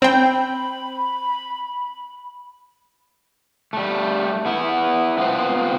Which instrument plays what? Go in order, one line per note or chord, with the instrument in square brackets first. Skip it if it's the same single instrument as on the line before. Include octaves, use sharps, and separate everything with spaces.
[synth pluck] C4 G5 [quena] B5
[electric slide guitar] G3 A3
B3 E4
B3 C4 F4 C5